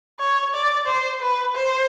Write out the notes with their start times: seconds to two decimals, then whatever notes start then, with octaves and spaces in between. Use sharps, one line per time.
0.20 C#5
0.54 D5
0.87 C5
1.21 B4
1.55 C5